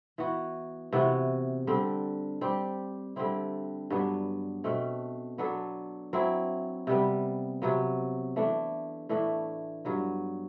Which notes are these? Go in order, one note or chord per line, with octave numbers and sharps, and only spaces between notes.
E3 B3 F#4
C3 E3 B3 F#4
D3 G3 C4
G3 C4 G4
D3 G3 C4 E4
G2 F#3 B3 D4
B2 A3 C4
F#3 B3 D4 A4
F#3 C4 E4
C3 G3 B3
C3 F#3 B3
E3 A3 D4
A2 E3 A3 D4
G2 F#3 B3